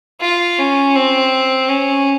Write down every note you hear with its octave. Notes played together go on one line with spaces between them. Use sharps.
F4
C#4
C4
C#4